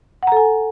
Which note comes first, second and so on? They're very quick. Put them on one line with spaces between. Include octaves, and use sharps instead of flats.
F#5 A#5 A4 G#5